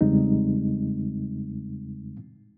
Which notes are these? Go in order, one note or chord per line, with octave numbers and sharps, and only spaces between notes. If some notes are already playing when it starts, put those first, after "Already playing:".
E2 C#3 G3 G#3 C4 D#4